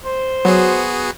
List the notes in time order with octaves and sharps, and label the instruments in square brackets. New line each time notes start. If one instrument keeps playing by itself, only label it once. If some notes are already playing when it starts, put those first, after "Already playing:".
[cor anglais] C5
[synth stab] F#3 [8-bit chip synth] B3 F#4 G#4